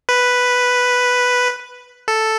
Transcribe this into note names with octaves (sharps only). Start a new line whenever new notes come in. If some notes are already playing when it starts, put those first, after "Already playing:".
B4
A4